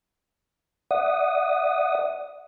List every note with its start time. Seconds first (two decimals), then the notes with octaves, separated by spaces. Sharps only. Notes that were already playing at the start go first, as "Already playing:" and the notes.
0.91 D5 E5 F#5 D#6